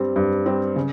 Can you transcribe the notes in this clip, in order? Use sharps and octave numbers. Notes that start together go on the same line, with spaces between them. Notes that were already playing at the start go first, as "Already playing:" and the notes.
Already playing: G2 G3 C4
G2
G3 C4
C#3